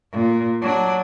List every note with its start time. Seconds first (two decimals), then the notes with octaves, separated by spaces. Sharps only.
0.12 A#2
0.62 F#3 D4